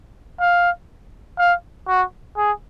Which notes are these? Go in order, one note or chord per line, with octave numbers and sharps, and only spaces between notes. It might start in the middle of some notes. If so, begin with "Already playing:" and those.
F5
F5
F#4
G#4